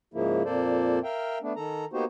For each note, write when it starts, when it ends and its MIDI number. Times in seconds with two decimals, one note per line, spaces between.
0.14 0.43 44
0.14 0.43 49
0.14 0.43 53
0.14 0.43 58
0.14 0.43 64
0.45 0.99 41
0.45 0.99 46
0.45 0.99 58
0.45 0.99 69
0.45 0.99 72
0.45 0.99 74
1.04 1.38 70
1.04 1.38 76
1.04 1.38 77
1.04 1.38 79
1.42 1.53 57
1.42 1.53 59
1.42 1.53 62
1.56 1.85 51
1.56 1.85 69
1.56 1.85 82
1.93 2.05 58
1.93 2.05 59
1.93 2.05 63
1.93 2.05 66
1.93 2.05 67
1.93 2.05 72